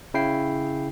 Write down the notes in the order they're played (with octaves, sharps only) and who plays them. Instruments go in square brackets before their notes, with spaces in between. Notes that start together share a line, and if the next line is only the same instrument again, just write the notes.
[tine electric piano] C#3 E4 G5 C7